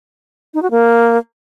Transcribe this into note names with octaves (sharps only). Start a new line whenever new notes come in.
D#4
F#4
A#3